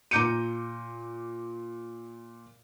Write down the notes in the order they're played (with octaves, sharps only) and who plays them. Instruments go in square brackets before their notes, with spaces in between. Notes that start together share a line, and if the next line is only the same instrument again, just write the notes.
[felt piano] A#2 A#5 D6 G6 C#7 D#7